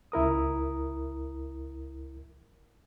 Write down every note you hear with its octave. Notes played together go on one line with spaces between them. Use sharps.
C#2 E4 A#4 D#6